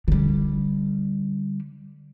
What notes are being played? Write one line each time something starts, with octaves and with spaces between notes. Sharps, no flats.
D3 G3